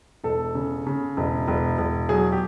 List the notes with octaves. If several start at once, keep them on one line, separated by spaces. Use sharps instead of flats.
E1 A4
C#3
C#3
E1
E1
E1
F#3 G#4
G4